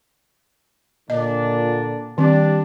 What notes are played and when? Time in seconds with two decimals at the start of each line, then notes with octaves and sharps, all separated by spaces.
1.10 A#2 D3 D4 D#5
2.18 D#3 G3 C4 D4